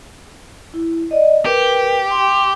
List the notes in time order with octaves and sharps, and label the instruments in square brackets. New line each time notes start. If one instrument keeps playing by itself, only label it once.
[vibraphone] E4
D5 D#5
[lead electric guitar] G4 [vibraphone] A#4 B4
[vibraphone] G5 C6